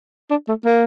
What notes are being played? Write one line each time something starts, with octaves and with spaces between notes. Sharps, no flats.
D4
A3
A#3